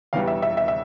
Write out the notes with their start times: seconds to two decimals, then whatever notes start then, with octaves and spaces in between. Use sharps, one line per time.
0.13 E1 E2 E3 G3 F5
0.28 E5
0.42 E5
0.57 E5
0.68 E5